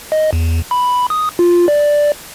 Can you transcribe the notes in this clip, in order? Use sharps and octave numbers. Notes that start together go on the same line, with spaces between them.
D#5
E2
B5
D#6
F4
D5